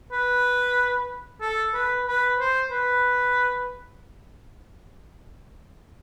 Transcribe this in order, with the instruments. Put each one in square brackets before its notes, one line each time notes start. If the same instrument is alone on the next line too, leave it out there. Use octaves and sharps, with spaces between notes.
[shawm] B4
A4
B4
B4
C5
B4